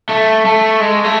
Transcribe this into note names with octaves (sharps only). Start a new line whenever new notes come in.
A3
A3
G#3
A3